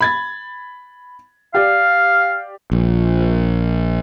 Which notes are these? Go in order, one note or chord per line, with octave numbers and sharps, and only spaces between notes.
B5 G#6 A6
G4 D5 F5
A#1